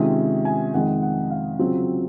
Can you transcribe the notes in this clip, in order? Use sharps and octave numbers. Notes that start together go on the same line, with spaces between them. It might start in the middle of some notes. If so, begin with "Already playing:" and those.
Already playing: C3 D#3 G#3 C#4 F4
G#5
F2 D#3 G#3 D#4 F#5
F#5
F5
C#3 F#3 C4 F4